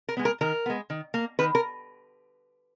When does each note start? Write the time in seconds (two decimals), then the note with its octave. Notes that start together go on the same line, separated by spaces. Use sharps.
0.09 A#4
0.17 G#3 B3
0.25 A#4
0.41 D#3 A#4
0.66 G#3 B3
0.90 D#3
1.14 A#3
1.39 D#3 B4
1.55 A#4